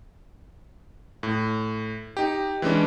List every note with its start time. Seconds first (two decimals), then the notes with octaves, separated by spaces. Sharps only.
1.23 A2
2.17 D#4 G4
2.62 E3 G#3 C#4 D4